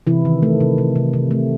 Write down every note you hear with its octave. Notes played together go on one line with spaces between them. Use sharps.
C3 E3 E4
D#3
A3
C3
C3
C3
C3
A3